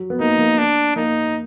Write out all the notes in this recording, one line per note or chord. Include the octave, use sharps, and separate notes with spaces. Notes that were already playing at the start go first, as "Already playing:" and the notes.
Already playing: F#3
B3
A#3 D#4
A#3
D4
A#3 D#4